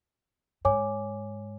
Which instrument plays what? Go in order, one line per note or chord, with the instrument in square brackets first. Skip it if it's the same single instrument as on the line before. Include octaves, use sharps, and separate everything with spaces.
[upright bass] G#2 [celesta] C#5 G#5 D6